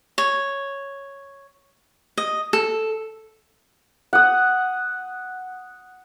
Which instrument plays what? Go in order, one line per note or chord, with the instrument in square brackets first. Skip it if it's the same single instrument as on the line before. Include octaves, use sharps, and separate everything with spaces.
[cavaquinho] C#5
D#5
A4
[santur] F#5 D#6